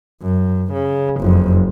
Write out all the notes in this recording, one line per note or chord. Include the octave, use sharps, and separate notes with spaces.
F#2
C#3
F#1 F2